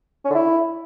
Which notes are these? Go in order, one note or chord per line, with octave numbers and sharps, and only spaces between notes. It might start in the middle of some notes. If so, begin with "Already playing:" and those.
C#4
D3
E4